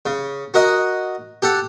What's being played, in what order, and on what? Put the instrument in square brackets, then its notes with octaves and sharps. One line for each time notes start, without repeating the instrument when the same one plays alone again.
[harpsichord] C#3
F#4 A#4 D#5 F#5
G4 A4 F#5